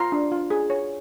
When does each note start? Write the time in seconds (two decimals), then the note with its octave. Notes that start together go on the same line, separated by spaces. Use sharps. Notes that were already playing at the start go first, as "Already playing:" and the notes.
Already playing: F4 A#5 C6
0.12 D4
0.31 F4
0.51 G#4
0.70 C#5